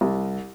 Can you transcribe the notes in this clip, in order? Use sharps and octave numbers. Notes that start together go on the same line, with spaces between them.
C2